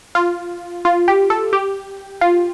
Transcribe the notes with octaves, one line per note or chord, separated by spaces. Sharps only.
F4
F4
G4
A4
G4
F4